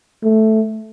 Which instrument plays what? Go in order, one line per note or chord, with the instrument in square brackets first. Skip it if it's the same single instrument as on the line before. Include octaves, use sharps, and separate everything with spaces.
[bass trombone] A3